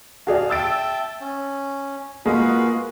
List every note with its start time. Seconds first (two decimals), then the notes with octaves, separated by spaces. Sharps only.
0.27 F#4 G#4 D5 F5
0.50 E5 G5 A5 E6 A6 D7
1.21 C#4
2.26 G#3 A#3 F4 F#4 B4